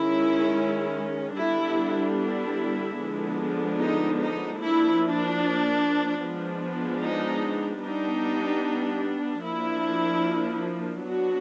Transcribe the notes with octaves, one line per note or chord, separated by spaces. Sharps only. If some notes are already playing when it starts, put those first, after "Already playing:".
Already playing: D#3 G#3 C#4 E4
D3 G3 B3 D4 E4
E4
D3 F3 G#3 B3 D4
D#4
D#4
F3 A#3 D4 E4
D4
F3 G#3 B3 D4
D#4
G3 B3 D4 D#4
F3 A#3 D4 E4
F#3 B3 D4 F#4